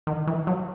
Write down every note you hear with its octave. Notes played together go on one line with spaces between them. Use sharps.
D#3
E3
F#3